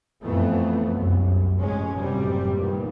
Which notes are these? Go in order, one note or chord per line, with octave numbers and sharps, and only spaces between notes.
F2 E3 A3 B3
C2 F#2
F1 G#2 G#3 C#4
F#1 A2 C3 G3
E2 G2 A#2 D#3